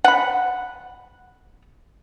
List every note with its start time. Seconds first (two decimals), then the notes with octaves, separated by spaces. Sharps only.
0.04 F#5 B5